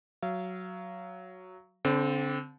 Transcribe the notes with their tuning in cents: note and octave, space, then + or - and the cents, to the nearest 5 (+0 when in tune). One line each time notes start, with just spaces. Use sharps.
F#3 +0 F5 -30
D3 -35 C4 -5